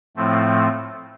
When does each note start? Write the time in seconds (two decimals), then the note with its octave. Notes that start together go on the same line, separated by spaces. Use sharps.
0.16 A2 F3 A3 C4